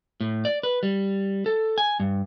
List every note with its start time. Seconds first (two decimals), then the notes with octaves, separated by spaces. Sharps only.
0.20 A2
0.45 D5
0.63 B4
0.83 G3
1.46 A4
1.78 G#5
2.00 G2